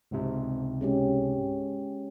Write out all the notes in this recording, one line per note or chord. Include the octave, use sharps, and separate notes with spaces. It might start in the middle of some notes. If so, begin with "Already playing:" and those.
C#2 G#2 C3
G#3 C#4 G4